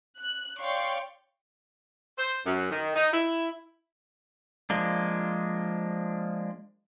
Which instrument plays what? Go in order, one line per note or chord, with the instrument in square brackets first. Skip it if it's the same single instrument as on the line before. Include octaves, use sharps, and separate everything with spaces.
[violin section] F#6
C#5 D5 F5 G5 C6 C#6
[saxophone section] C5
F#2
D#3
D#4
E4
[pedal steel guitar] F3 G#3 A#3 D4